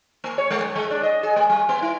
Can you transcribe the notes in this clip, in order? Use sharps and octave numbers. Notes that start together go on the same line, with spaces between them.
A#3
C#5
G#3
F#2
G#3
D4
D#5
G#4
A3
G3
B3
E4